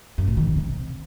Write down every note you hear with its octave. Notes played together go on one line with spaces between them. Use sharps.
F#2
A#2
D#3
E2
C3